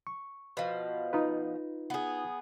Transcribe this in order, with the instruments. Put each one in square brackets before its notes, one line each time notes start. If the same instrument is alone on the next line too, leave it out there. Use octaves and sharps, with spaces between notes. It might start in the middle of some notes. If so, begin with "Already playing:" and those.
[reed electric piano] C#6
[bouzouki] B2 F3
[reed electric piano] D#4 F4 B4
[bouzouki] B3 G#4